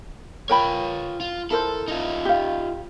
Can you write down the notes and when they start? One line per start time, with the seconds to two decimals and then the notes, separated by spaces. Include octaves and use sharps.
0.50 F4 A#4 C#5 G5 B5
1.20 F4
1.51 E4 A4 A#4 C5
1.88 D#4 F4
2.25 G4 F5